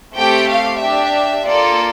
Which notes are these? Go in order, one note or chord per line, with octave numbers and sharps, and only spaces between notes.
A3 C4 G4 G5
F5
D4 G4 E5
A#3 F4 A4 D5